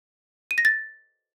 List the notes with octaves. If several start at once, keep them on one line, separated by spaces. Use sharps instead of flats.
D#7
A#6
A6